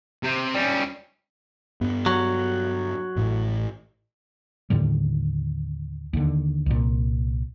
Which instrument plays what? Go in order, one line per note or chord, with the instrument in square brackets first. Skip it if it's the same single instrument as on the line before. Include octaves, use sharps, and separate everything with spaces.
[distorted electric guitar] C3
G3 C#4
[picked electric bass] G2 B3
[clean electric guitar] F#3
[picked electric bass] A1 A2
[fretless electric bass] D#2 A2 D3 G3
D#2 D3
C2 A#2